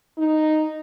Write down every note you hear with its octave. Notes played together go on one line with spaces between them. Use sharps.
D#4